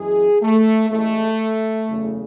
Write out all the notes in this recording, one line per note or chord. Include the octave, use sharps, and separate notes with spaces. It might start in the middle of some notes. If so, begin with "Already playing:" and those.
Already playing: F#2 E3 G#3 G#4
A3
A1 A2 G#3 A3
F#1 E2 C#3